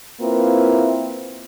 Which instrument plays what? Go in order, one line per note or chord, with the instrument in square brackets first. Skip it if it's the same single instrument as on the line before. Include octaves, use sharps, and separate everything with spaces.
[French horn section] A#3 C4 E4 F4 A#4 B4